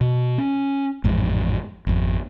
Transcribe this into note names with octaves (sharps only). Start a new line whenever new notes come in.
B2
C#4
A1 F2 G#2
G#1 F2